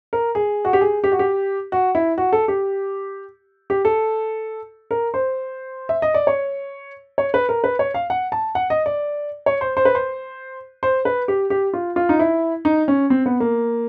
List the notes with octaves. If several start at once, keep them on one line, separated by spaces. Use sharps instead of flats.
A#4
G#4
F#4
G4
G#4
G4
F#4
G4
F#4
E4
F#4
A4
G4
G4
A4
A#4
C5
E5
D#5
D5
C#5
C#5
B4
A#4
B4
C#5
F5
F#5
A5
F#5
D#5
D5
C#5
C5
C5
B4
C5
C5
B4
G4
G4
F4
F4
D#4
E4
D#4
C#4
C4
B3
A#3